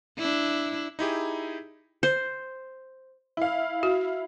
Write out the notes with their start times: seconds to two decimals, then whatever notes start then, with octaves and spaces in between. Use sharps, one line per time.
0.19 D4 E4
0.99 D#4 E4 G4 G#4
2.03 C5
3.37 E4 F5
3.83 F#4